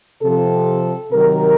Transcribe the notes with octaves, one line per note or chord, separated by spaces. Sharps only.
C3 F3 A4
C3 D#3 F#3 A#4